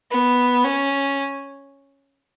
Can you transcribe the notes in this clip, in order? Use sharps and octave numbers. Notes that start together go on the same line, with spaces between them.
B3
C#4